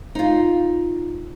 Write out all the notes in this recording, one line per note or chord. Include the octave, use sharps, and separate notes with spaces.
D#4 F4